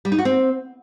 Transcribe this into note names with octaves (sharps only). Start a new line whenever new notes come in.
G3
D#4
F#4
C4